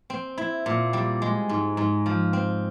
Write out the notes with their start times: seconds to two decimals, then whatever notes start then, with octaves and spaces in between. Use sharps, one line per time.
0.10 C4
0.38 E4
0.66 A#2
0.93 G3
1.22 G#3
1.49 G#2
1.77 G#2
2.06 F3
2.33 C4